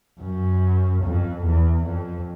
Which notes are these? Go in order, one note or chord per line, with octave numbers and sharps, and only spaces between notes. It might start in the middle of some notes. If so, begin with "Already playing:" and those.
F#2
F2
E2
F2